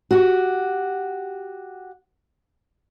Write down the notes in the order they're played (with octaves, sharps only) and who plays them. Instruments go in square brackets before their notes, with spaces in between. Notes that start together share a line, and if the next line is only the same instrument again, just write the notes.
[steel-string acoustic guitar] F#4 G4